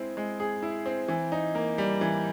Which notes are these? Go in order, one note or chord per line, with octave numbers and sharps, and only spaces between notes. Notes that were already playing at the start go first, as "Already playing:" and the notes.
Already playing: G#3 C4 E4 G#4
G#3
G#4
E4
C4
E3
D#4
A#3
G3
E3